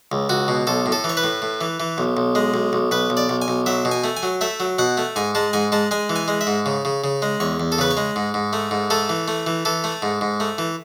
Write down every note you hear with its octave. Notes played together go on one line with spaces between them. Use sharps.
C#2
C#2 F#4
B2
B1 A4
A2
A4
E3
C#5
B4
A2
A2
E3
E3
B1
B1
G#3
B1
B1
B1 B4
B1
D5
B1
G#5
B1
F#3 E5
B2
G#5
A3
G#5
F#3
A3 E5
F#3
B2 F#5
A3
G#2 G#5
G#3 A5
G#2 G#5
G#3 A5
G#3 G#5
E3
G#5
G#3
E5
G#2
C#3
C#3
C#3
G#3
E2 C#5
E2
A4
C#3 B4
C#5
G#3
G#2
G#2
A3
G#2
A3 A4
E3
A3
E3
E3 A4
A3
G#2
G#2
A3
E3